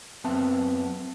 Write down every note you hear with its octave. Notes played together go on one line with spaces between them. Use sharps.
F#2 B3 C4 E5 A5